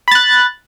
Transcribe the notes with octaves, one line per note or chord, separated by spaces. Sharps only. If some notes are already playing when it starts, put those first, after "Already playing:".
B5 F#6 A6